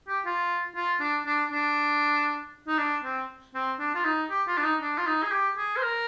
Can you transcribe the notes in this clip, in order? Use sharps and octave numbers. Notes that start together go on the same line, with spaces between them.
G4
F4
F4
D4
D4
D4
D#4
D4
C4
C4
D4
F4
D#4
G4
F4
D4
D#4
D4
F4
D#4
G#4
G4
G#4
C5
A#4